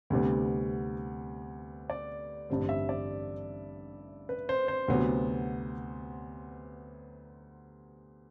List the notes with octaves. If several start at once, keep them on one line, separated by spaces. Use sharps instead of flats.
D2 C3 G3 B3
D5
A1 G2 D3 G3 C4 C5
E5
D5
B4
C5
C5
D2 C3 F#3 B3